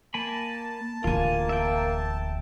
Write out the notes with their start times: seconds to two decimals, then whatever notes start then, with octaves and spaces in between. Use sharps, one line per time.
0.14 A#3 G#5 A5 B5
1.04 D1 A1 A#3 F4 G#5
1.49 E5 G5